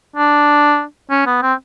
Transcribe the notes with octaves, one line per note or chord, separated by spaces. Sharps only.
D4
C#4
B3
C4